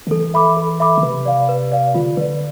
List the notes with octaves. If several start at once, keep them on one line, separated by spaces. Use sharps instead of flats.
D3
E3 A4
E5 B5 D6
A4
E5 B5 D6
D3
C3 B4
D5 F5
B4
D5 F5
D3 F4
D3 B4 D5